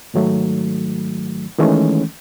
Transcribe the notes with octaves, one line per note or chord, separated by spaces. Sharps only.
G#2 D#3 F#3 A3
D#3 E3 G#3 A3 C#4